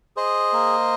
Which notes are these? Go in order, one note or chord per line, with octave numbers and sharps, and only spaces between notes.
G#4 C5 D#5
A#3